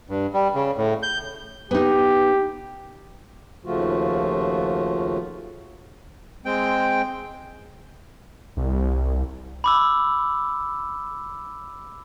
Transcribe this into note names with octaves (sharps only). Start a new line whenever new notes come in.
G2
G3
C#3
A2
G6
B3 D#4 G4
D#2 C#3 F3 A3 F4 F#4
G#3 C4 G5
C2
B5 D6 E6